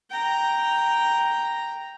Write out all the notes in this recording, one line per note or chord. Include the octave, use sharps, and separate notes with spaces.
G5 A#5